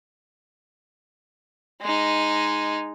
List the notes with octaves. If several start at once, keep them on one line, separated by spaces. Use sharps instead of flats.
G#3 D#4